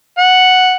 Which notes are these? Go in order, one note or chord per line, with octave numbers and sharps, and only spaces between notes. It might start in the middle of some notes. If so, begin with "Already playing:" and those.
F#5